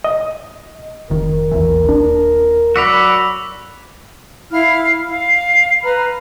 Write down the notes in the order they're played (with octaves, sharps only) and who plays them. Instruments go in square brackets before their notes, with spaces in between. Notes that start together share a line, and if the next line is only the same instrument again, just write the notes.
[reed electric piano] D#5
[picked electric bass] F1 D#3 [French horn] A#4
[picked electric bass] A#1 E2 E3
D#1 D4
[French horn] F#3 [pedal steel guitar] F#4 D5 B5 [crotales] E6 B6 F7
[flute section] E4 F5 F6
F5
B4 A#5 B5 F6